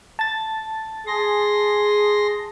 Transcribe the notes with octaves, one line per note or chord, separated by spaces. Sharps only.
A5 A6
G#4 C6 A#6